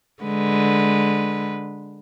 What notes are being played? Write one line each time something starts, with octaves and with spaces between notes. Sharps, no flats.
D3 G#3 B4